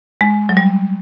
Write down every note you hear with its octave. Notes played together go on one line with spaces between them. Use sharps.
G#3
F#3
G3